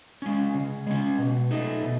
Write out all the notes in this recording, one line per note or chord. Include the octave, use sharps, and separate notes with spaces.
G#3 C#4
C#3
G#3 C#4
B2
A3 D#4
B2